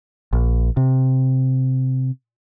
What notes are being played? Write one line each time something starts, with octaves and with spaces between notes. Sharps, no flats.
A#1
C3